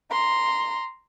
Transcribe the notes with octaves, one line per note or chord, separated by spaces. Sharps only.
A#5 C6